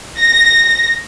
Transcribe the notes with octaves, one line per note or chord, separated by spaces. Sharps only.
A#6